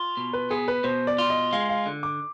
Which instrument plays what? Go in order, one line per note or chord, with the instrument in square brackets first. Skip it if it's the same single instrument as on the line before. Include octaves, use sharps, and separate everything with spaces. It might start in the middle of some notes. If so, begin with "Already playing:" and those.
Already playing: [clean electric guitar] F4
B2
[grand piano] B4
[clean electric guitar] B3 [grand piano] G#4
[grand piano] B4
[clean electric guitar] B2 [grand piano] C5
[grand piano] D5
[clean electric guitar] F4
[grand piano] D#5
[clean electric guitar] G#3 [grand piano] F5
[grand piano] F5
[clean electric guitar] D3
[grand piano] D6